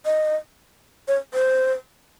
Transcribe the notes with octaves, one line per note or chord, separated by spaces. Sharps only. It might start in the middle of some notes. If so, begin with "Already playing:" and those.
D#5
C#5
C5